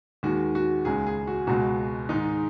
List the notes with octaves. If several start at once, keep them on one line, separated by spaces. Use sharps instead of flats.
D#2 D#3 G#3 F#4
F#4
C#2 C#3 G#3 G#4
G#4
F#4
C#2 B2 G#3 F#4
G#2 D#3 G#3 D#4